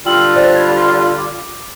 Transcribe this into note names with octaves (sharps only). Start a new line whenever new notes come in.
D3 G3 F4 G5 E6 F#7
C5 D5 A6
B5 G#6
D6